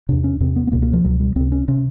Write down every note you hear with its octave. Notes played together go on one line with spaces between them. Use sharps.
E2 C3 D4
C#4
E2 C3 C4
B3
B3
C#2 B2 A#3
A#3
F3
C#2 B2 F#3
G3
C#2 C3 C4
C#4
C3 C#4